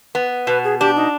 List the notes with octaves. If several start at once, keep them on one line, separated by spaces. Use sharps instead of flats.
B3 B4
B2 B4
G#4
D4 G4
D#4